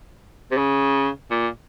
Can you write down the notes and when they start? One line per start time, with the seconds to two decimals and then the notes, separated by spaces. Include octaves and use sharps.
0.52 C3
0.57 C#3
1.31 A#2